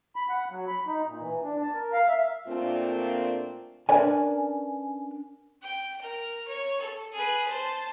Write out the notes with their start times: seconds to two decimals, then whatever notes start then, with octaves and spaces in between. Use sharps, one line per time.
0.16 B5
0.29 F#5
0.51 F#3
0.67 B5
0.87 D#4
1.07 A#2
1.20 E3
1.43 D4
1.62 A5
1.74 A#4
1.93 F5
2.08 E5
2.47 A#2 A3 A#3 C4 D4 F4
3.89 C#4 D4 A#4 B4 D5 G#5
5.62 G5
6.01 A#4
6.48 C#5
6.80 A4
7.13 G#4 B4
7.48 C5 A5